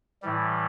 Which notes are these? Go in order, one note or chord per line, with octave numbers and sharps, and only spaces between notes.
A2 E3 G3